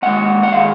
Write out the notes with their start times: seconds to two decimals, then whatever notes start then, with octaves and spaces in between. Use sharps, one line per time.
0.02 D#2 D#3 G#3 F#5
0.43 F#5
0.52 D#3 G#3 F5